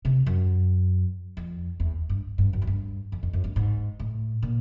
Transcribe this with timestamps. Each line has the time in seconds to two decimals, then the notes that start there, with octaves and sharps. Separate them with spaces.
0.05 C3
0.26 F#2
1.37 F2
1.80 E2
2.09 G2
2.38 G2
2.53 F#2
2.62 G#2
2.67 G2
3.12 F2
3.23 F2
3.33 F#2
3.44 G2
3.56 G#2
4.00 A2
4.43 A#2